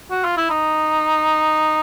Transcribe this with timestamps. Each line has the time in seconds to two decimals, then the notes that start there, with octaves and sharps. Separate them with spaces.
0.11 F#4
0.24 F4
0.37 E4
0.50 D#4